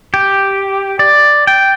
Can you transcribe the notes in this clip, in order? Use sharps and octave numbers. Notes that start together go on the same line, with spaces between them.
G4
D5
G5